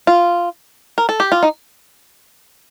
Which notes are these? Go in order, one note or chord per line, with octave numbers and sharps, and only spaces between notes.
F4
A#4
A4
G4
F4
D#4